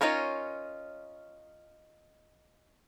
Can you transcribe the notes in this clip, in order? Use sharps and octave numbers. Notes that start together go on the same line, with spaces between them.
C#4 D#4 F4 A#4 C#5